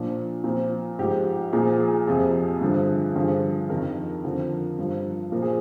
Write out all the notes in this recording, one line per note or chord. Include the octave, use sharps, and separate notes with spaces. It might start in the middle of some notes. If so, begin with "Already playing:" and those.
Already playing: A#2 F3 D4
A#2 F3 C4
G#2 F3 G4
A#2 F3 G#4
G#4
F2 C3 F3 G#4
G2 D3 F3
G2 D3 F3 G#4
F2 D#3 A#4
F2 D3 F3
G2 F3
A#2 F3 A#4
G#4